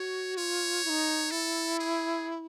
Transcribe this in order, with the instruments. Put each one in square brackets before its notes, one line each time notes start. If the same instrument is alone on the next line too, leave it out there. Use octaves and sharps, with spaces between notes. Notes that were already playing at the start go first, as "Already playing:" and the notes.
Already playing: [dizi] F#4 [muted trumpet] C#5
[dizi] F4 [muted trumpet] C#5
[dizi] E4
D#4
[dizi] E4 [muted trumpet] A4
[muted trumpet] G#4